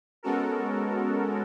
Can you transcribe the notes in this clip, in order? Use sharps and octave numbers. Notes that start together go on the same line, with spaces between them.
G#3 B3 C#4 F#4 A4 A#4